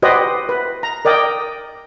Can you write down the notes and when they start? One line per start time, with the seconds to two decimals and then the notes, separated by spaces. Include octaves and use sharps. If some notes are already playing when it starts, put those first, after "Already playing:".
0.02 F#4 G4 B4 C5 D5 D#5
0.49 B4
0.83 A#5
1.05 A#4 D5 D#5 G5